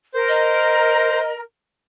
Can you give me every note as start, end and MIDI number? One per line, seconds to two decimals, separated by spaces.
0.14 1.42 70
0.14 1.20 72
0.28 1.31 75